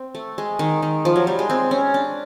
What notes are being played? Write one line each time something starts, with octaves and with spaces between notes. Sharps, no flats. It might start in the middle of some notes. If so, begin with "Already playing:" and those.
Already playing: C4
A3
G#3
D#3
D#3
F3
F#3
G3
G#3
C4
C#4
D4